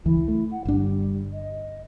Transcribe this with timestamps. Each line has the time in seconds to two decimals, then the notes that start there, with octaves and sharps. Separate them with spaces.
0.05 C#2 E3 E4
0.28 A3
0.51 F#5
0.65 G1 G3 D4
1.34 D#5